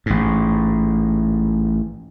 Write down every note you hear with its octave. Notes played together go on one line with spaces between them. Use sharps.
A1 G#2